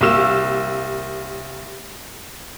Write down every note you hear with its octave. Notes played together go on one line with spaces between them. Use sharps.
C2 A#3 G4 E6 E7